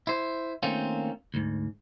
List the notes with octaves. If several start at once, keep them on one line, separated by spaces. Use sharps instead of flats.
E4 C5
D#3 A3 A#3 C4 C#4 F4
D2 G#2